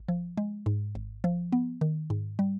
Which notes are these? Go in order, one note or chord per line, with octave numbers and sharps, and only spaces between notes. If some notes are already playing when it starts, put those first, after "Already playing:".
Already playing: G#1
F3
G#3
G#2
G#1
F3
B3
D#3
G#2
G3